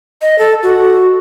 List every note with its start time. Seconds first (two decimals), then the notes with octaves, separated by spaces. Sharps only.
0.22 D#5
0.39 A4
0.63 F#4